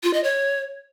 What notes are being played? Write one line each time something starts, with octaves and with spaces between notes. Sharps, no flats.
F4
D#5
C#5